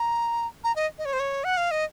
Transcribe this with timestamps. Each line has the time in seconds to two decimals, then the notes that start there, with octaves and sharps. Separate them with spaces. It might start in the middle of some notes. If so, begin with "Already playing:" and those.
Already playing: A#5
0.64 A#5
0.76 D#5
0.98 D#5
1.05 C#5
1.13 C5
1.20 C#5
1.44 F#5
1.57 F5
1.71 D#5